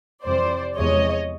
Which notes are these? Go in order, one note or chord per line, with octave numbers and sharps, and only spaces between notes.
F2 C3 E3 G3 C5 D5
E2 C3 F3 G#3 C#5 D#5